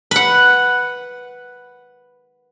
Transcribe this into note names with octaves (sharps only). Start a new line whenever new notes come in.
B4 F#5